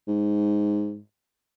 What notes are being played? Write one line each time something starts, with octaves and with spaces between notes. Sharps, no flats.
G#2